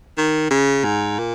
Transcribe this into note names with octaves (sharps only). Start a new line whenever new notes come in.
D#3
C#3
G#2
A#2